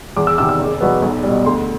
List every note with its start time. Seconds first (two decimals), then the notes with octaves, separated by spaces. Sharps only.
0.17 E2 D6
0.27 E6
0.38 C3 D#3 E6
0.49 E6
0.59 F#1
0.81 E2 B2 F#3 B3
1.02 B1
1.23 B2 G3
1.46 D2 C6